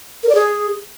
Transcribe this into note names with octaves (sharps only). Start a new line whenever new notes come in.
A#4
D5
G#4